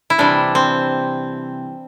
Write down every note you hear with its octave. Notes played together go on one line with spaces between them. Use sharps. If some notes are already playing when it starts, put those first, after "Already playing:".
E4
C3 E3 G3 D4
C4